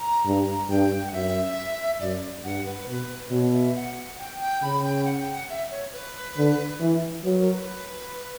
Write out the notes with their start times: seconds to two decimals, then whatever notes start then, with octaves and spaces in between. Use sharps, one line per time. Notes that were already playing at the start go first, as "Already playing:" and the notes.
Already playing: A#5
0.25 G2
0.69 G2 G5
1.07 F#5
1.13 F#2 E5
2.00 F#2 D5
2.44 G2 F#5
2.66 B4
2.87 B2 B4
3.31 B2 C#5
3.53 E5
3.75 F#5
4.18 G5
4.40 G5
4.62 C#3 B5
4.84 G5
5.05 F#5
5.19 G5
5.33 F#5
5.49 E5
5.71 C#5
5.93 B4
6.37 D3
6.80 E3
7.23 F#3 B4
7.38 A#4
7.53 B4